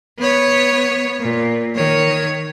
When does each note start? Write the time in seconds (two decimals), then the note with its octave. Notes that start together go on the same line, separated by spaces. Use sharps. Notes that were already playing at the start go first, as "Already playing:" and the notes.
0.19 B3 C#5
1.20 A#2
1.75 D#3 C#5